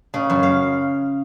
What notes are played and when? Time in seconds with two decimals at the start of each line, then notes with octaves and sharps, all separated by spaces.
0.14 C#3
0.30 F#2
0.43 F5